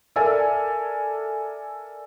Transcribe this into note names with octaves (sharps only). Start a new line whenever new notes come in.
A4 A#4 D5 E5 G#5 A5